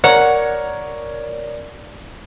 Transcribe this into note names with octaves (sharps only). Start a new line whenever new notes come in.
A#4 C#5 D5 F#5 A#5